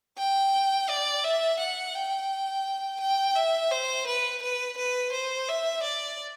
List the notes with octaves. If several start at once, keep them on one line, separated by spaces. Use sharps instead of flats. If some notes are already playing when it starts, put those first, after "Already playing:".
G5
D5
E5
F#5
G5
G5
E5
C5
B4
B4
B4
C5
E5
D5